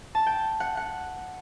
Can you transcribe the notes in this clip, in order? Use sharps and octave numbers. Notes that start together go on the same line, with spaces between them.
A5
G5
F#5
F#5